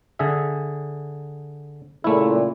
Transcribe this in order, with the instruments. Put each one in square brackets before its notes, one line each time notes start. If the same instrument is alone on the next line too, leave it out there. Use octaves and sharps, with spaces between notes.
[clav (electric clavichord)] D3 G#4 E5
[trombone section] A#2 C#3 [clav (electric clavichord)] A3 E4